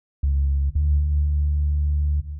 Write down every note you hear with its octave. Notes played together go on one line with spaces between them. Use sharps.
C#2
D2